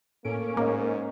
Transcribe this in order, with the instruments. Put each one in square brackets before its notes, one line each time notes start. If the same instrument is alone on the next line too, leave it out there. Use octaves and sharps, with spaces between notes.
[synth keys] A2 A4 D7 [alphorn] A#3 [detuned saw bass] C#4
[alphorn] G#2 [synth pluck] A#3 [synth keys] A#4 D#5